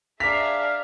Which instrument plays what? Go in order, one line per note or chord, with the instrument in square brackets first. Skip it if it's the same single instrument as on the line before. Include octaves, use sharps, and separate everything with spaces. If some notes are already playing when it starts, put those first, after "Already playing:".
[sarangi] D4 [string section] G#4 E5 A#5 [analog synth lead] F5 [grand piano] D6 B6